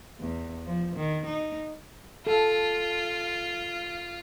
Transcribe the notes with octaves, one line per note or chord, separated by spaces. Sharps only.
E2
F3
D#3
D#4
F4 A4